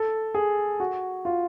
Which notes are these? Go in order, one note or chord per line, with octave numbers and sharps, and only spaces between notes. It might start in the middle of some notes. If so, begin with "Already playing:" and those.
Already playing: A4
G#4
F#4
F4